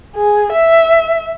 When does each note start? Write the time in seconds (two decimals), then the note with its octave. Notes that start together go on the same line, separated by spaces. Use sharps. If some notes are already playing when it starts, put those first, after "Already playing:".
0.15 G#4
0.52 E5